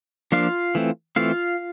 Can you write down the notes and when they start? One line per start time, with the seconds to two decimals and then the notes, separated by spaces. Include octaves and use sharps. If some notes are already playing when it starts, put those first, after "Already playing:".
0.32 F3 A#3 D4 F4 F5
0.75 E3 A3 C4
1.16 E3 A3 C4 F4 F5